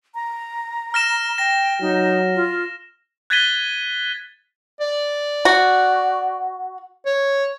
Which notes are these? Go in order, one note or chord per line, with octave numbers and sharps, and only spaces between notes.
A#5
F6 A#6 E7
G5 A#6
F#3 D#4
F4
F#6 G#6 A6 B6 D#7 G7
D5
F#4
C#5